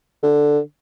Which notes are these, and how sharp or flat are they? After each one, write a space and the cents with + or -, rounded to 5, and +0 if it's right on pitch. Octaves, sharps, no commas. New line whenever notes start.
D3 +5